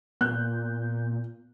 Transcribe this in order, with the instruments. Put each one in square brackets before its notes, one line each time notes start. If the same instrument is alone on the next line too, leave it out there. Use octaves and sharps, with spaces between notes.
[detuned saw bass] A#2 [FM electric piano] B3 G6 [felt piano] F#6